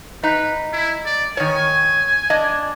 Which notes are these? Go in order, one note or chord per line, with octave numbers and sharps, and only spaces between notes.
D#4 B4
E4
D5
D#3 C#5 G#5
D4 D#5